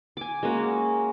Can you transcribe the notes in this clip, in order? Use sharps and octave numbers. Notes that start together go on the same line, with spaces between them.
G#5 D6
G#3 A#3 C#4 F#4